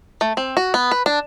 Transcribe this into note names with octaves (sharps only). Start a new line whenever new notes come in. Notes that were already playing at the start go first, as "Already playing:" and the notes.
A3
C4
F#4
B3
B4
D4